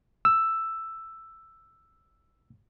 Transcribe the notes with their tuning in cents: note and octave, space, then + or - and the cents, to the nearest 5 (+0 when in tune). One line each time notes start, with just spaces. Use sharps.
E6 +5